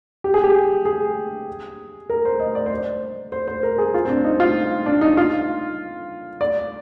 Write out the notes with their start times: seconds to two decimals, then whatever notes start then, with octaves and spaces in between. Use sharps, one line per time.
0.24 G4
0.34 G#4
0.44 G4
0.85 G#4
2.10 A#4
2.25 C5
2.40 D#5
2.55 D5
2.66 C5
2.78 D5
3.32 C5
3.48 C5
3.63 A#4
3.78 G#4
3.94 F4
4.05 C4
4.09 D4
4.24 D#4
4.40 F4
4.86 D4
5.01 D#4
5.17 F4
6.41 D5